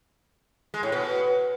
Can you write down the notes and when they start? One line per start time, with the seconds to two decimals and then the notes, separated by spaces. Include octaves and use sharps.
0.74 G#3
0.83 A2
0.92 B2